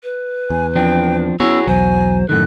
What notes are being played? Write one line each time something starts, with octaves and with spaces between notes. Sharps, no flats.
B4
E2 G#5
F3 C4 D4 G5
B3 C#4 E4 F#4 G#4 C#5 E6
B1 E2 F#3 C5 G#5
F#2 A2 D#3 A4 F#6